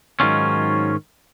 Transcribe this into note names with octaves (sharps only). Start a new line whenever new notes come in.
G#2 D#3 F#3 C#4 F4